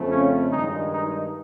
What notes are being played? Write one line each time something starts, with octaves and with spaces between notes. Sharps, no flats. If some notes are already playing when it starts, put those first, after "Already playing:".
Already playing: F2 C#3 F3 A3 C4
C#4
G2 D#3 G#3 D#4
D#4